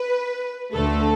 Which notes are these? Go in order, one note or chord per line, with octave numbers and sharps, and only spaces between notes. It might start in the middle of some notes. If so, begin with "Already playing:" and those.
Already playing: B4
D2 D3 A3 A4